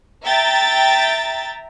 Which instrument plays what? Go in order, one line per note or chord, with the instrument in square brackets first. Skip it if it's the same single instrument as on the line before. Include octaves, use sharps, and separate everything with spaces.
[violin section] E5 G5 A#5 A6